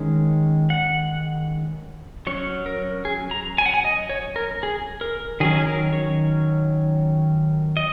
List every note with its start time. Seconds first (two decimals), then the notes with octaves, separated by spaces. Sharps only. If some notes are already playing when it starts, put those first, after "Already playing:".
Already playing: D#3 G#3 C#4
0.70 F#5
2.27 F#3 C#4 C#5
2.66 A#4
3.05 G#4
3.31 A#5
3.58 G#5
3.66 F#5
3.74 G#5
3.84 D#5
4.10 C#5
4.36 A#4
4.63 G#4
5.01 A#4
5.40 D#3 F#3 C#4 G#4
5.58 G#4
5.67 A#4
5.93 C#5
7.77 D#5